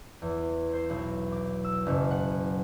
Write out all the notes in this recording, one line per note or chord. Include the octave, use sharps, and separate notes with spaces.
E2
C5
B1
D6
E6
F#1
F#5